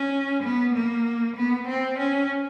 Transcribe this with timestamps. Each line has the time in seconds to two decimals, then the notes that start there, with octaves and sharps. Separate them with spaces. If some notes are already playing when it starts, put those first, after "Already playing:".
Already playing: C#4
0.43 B3
0.74 A#3
1.36 B3
1.68 C4
1.99 C#4